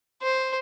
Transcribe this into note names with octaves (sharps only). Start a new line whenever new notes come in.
C5